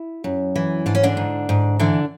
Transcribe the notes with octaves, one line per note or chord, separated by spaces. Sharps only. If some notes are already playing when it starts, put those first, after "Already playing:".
Already playing: E4
F#2
E3
G#2 D4
C#4
D3 D4
G#2
G#2
D3 E3 D4